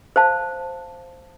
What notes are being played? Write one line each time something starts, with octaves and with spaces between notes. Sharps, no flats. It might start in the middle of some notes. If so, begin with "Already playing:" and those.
C5 F5 A5